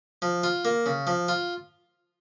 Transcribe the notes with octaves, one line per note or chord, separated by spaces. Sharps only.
F3
F4
A#3
C#3
F3
F4